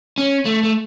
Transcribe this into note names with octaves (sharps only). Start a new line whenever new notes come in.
C#4
A3
A3